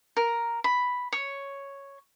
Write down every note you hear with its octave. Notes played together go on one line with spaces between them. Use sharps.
A#4
B5
C#5